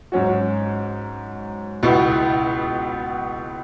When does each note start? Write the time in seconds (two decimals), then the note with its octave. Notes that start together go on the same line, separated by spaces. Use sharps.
0.12 G#2 F#3 C#4 F#4
1.83 C#2 B2 B3 E4